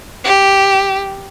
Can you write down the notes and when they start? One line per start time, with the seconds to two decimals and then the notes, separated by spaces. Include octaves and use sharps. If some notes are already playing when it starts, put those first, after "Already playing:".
0.24 G4